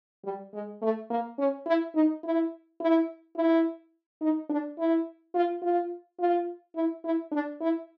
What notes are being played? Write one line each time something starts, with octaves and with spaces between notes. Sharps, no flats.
G3
G#3
A3
A#3
C#4
E4
D#4
E4
E4
E4
D#4
D4
E4
F4
F4
F4
E4
E4
D4
E4